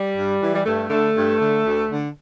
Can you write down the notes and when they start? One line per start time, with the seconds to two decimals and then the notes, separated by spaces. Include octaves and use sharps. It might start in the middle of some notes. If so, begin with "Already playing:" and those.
Already playing: G3
0.15 G2
0.40 E3
0.54 G3
0.65 G2 A3
0.89 D3 A3
1.15 G2
1.40 D3
1.64 D2
1.89 D3